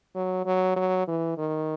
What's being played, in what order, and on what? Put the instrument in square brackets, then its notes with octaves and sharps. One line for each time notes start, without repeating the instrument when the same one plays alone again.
[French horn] F#3
F#3
F#3
E3
D#3